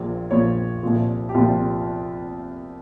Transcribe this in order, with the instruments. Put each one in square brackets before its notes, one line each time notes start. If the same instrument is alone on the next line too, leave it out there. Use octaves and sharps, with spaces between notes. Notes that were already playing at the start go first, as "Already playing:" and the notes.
Already playing: [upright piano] A#1 A#2 F3
A#1 A#2 F3 C#5
C2 A#2 F3
G4
C2 A#2 F3 F4